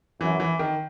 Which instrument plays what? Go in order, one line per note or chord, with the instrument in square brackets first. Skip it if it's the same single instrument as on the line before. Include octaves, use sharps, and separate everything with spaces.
[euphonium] F#2 [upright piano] E3
[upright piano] E3
D#3